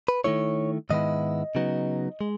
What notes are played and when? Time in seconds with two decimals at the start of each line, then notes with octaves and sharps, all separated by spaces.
0.08 B4
0.24 D#3 A3 E4 C#5
0.90 G#2 D#3 G#3 B3 E4 D#5
1.55 C#3 F#3 B3 D#4
2.21 G#3